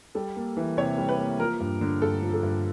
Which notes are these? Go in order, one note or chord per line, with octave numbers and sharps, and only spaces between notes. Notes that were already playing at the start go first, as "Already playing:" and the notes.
G3 A4
A#3
E3
C3 C#5
G3
B4
A#3
F3 A#4
G2
D3
G2 A4
F3
A4
G2